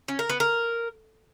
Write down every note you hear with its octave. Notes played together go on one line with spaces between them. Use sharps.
C#4
A#4
B3
A#4